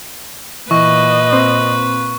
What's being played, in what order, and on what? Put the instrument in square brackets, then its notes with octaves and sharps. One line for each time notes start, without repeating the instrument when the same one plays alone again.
[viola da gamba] A#2 B4 [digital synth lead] E3 [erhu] D#5 [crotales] C#6
[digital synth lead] C4